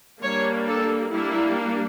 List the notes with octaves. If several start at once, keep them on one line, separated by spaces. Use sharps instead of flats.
G3 A#3 D4 C#5
A4
G3 A#3 D4 E4